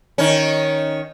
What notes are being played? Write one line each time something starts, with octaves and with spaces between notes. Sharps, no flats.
D#3 C#4